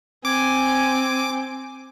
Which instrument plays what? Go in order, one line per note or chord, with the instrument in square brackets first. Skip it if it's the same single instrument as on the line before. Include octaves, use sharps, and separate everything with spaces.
[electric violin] C4 [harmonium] G#5 [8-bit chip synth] D6